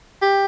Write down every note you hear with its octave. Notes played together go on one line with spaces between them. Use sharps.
G4